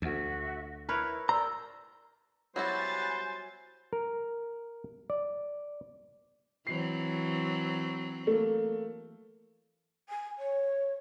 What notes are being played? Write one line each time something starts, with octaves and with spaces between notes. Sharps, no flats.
D2 F#4 E5
E4 A#4 B4 C#5
A#4 C5 D5 A#5 E6
F#3 G3 B3 E4 F#4 C5 G#5 A6
A#4
D5
E3 F#3 C4 C7
A3 A#3
G#5
C#5